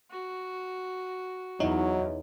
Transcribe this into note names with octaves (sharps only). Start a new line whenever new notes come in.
F#4
E2 F#3 D#4 E4 C#5